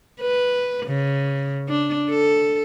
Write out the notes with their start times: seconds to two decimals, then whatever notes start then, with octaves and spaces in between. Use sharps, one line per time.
0.21 B4
0.86 C#3
1.68 D4
2.10 A4